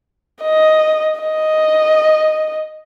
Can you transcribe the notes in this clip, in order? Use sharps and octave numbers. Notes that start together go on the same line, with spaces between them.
D#5
D#5